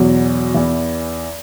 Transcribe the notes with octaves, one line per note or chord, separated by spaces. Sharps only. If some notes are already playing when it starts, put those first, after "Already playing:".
Already playing: E2 B2 F#3
E2 E3